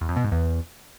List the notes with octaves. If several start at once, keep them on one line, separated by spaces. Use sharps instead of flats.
E2
F2
B2
G#2
E2